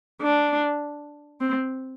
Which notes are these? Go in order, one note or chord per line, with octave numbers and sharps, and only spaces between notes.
D4
C4